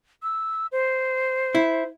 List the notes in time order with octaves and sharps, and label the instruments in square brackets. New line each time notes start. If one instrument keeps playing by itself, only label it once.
[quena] E6
C5
[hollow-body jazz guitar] E4